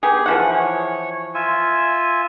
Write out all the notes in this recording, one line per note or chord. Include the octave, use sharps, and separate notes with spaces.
B3 G4 G#4
E3 F3 F#5 C#6
C#5
F4 E5 G#5